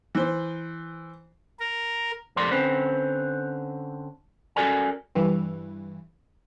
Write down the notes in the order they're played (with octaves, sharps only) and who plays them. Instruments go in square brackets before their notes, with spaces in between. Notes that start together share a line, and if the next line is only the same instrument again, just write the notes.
[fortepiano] E3 C5
[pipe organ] A#4
[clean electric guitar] F2 C3 A3 A#4 D5 C6
D3 C4 C#4 B4 C5
C#4 F#4 A4 A#4 D5 G#5
[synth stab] G2 E3